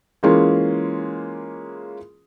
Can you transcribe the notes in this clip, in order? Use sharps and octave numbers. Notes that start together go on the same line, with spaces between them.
E3 G#3 A#3 C#4 F4 G#4